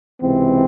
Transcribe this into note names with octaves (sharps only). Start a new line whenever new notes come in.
C#2 C3 E3 C4